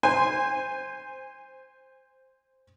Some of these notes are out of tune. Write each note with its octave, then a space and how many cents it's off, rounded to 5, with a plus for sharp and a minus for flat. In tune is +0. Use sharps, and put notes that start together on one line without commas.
C5 +0 G#5 -30